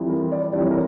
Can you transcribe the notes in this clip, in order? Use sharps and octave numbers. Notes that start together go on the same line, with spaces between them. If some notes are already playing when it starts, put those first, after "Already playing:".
Already playing: F2 E3 G3
A#4
D5
F2 E3 G3 D5
C#5
A#4